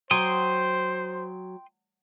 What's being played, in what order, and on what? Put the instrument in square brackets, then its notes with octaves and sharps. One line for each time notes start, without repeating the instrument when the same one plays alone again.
[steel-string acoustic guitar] F#3 [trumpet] C5 [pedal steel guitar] G5 C6 D#6